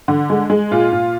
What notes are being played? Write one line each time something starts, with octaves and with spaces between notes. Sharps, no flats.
D3
G#3
G#3
A#2 F4
A#2